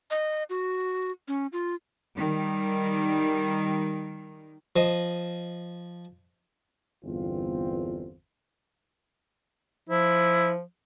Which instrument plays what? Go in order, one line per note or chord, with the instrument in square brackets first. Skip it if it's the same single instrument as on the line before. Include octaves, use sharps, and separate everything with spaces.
[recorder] D#5
F#4
C#4
F4
[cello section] D#3 G3
[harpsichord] F3 D#5
[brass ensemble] G1 E2 C4 F4
[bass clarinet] F3 [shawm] E4